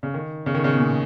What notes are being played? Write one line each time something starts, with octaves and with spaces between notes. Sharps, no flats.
C#3
D#3
C#3
D#3
C#3
B2
A#2